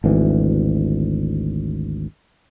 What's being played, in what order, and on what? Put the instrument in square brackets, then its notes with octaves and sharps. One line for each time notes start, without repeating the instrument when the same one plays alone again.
[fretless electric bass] G#1 D2 E3